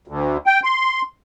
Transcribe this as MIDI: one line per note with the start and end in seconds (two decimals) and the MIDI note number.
0.08 0.37 38
0.46 0.60 79
0.64 1.02 84